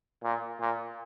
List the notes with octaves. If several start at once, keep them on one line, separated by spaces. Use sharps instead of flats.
A#2
A#2